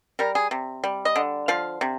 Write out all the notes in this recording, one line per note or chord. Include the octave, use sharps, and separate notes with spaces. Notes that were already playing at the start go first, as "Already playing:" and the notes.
G3 A#4
G#4
C3
G3
D#5
D3
F3 F5
C3